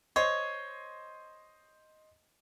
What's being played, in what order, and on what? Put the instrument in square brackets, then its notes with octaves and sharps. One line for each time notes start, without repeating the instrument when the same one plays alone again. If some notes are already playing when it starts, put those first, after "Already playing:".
[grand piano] C5 D#5 C6 [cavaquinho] C#5